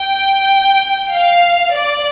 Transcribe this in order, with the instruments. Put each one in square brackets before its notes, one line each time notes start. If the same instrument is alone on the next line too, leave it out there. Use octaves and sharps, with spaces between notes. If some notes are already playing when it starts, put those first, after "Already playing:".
Already playing: [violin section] G5
F5
D5